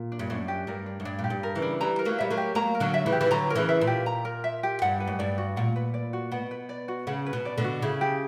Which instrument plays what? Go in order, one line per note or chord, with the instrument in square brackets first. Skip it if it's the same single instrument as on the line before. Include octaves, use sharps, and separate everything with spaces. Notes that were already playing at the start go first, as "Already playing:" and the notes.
Already playing: [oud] A#2
[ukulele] D4
[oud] G2
[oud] F#2 [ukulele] D4
[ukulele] G4
[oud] G2 [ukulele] A#4
[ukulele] D4
[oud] F#2
[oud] G2 [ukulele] D4
[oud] A#2
[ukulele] G4
[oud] G2
[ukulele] A#4
[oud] C#3 E3
[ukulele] D4
[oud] E3 G3 [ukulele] A#5
[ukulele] A#4
[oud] F#3 A#3
[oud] G3 [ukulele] E5
[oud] F#3 A#3
[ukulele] G4
[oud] F#3 A#3 [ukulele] A#5
[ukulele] A#4
[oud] D3 F#3
[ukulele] E5
[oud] C#3 E3
[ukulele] G4
[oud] E3
[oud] D3 F#3 [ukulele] A#5
[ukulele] A#4
[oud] C#3 E3
[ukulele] E5
[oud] A#2
[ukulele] G4
A#5
A#4
E5
G4
[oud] G2 [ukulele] F#5
[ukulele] B4
[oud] F#2
[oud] G2 [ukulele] D5
[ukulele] F#4
[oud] A#2 [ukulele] F#5
[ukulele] B4
D5
F#4
[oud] B2 [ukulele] F#5
[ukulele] B4
D5
F#4
[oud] C#3 [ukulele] F#5
[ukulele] B4
[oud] B2
[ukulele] D5
[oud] B2 D3
[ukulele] F#4
[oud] C#3 [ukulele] E4
[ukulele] G4